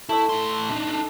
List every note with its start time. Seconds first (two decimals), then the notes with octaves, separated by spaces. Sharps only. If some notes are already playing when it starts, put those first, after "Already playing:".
0.09 A3 E4 E5
0.29 A2 C6
0.71 D4 D#4